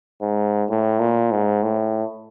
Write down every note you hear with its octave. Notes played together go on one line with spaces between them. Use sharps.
G#2
A2
A#2
G#2
A2